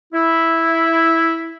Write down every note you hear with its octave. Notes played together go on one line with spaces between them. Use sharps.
E4